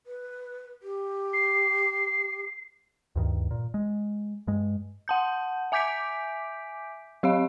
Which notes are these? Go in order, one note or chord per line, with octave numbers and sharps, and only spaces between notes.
B4
G4
C7
D2 G2 D#3
A#2
G#3
G2 G#3
F#5 A5 G6
E5 G#5 D6 G6 B6 D7
F#3 G4 D#5 F5